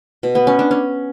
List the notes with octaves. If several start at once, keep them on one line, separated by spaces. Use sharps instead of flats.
B2
B3
C#4
D4
C#4